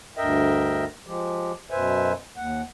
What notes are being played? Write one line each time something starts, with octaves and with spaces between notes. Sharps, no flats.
D2 G2 A#4 D#5 E5 G5
F3 G#3 G4
F#2 B2 B4 C5 E5 G#5
D#2 F#5